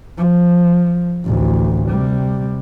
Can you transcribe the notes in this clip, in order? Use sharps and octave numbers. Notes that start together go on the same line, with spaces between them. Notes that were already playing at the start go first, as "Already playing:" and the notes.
F3
A1 D2
C3 G3